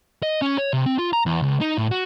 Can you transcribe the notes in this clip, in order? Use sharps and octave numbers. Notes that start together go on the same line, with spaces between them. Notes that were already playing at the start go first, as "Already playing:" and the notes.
D#5
C#4
C#5
C3
C4
F4
A#5
E2
C#2
D#4
A2
F#4